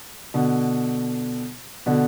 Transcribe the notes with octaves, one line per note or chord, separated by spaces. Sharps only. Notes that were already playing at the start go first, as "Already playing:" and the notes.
B2 D3
B2 D3